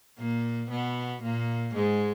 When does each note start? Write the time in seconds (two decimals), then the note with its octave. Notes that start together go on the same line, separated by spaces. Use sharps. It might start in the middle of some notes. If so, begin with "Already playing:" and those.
0.18 A#2 A#3
0.70 B2 B3
1.22 A#2 A#3
1.74 G#2 G#3